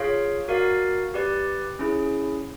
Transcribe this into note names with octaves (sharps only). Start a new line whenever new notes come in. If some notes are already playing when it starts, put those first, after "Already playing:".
Already playing: F4 G#4 C#5 F5
F#4 A#4 D5 F5
G4 B4 D5
C#4 E4 G#4